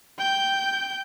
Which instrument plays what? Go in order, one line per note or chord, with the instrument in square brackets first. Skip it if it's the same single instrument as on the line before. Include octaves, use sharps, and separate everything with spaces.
[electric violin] G5 G6